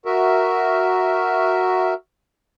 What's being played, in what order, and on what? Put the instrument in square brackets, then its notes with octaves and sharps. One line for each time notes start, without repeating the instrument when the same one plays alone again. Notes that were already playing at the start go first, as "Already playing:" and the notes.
[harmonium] F#4 A#4 E5